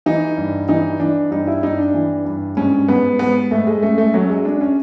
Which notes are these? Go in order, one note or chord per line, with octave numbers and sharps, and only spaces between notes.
E3 D#4
G2
E3 D#4
E3 D4
G2 D#4
E4
G2 D#4
D4
E3
G2
G#2 C#4
G#2 B3
G#2 B3
G#2 A3
G#3
F#2 A3
A3
F#2 F#3
G#3
F#2 D4
C#4